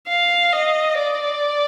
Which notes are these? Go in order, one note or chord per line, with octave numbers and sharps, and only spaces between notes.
F5
D#5
D5